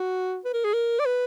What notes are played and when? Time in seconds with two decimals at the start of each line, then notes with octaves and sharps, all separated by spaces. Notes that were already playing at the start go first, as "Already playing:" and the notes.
Already playing: F#4
0.45 B4
0.54 A#4
0.65 G#4
0.74 A#4
0.99 D5
1.06 B4